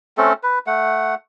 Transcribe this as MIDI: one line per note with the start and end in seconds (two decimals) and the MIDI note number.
0.18 0.33 57
0.18 0.33 60
0.18 0.33 61
0.18 0.33 69
0.43 0.59 71
0.67 1.15 57
0.67 1.15 78